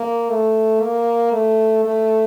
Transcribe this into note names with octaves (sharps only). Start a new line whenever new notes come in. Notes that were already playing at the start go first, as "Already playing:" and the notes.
Already playing: A#3
A3
A#3
A3
A3